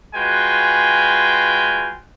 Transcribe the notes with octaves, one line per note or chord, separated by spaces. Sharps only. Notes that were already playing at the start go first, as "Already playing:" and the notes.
G#3 F4 F#4 B4 G5 G#5